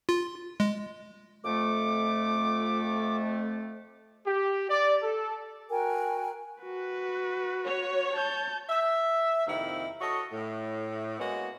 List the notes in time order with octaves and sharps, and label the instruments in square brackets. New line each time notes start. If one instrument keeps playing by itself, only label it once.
[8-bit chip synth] F4
G#3
[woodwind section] F2 A3 [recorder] D6
[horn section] G4
D5
A4
[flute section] F#4 A#4 G5 G#5
[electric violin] F#4 B4
[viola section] C#5
[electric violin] A5 G6
[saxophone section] E5
F2 C3 D#3 A#3 E4
F#4 A4 C#5 D#5
A2
G#3 A#3 B3 C#4 F#4